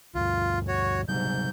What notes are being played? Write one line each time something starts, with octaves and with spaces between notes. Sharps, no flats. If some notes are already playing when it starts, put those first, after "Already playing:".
D2 G2 F4
F#4 C#5
G#2 C3 F#3 G3 G6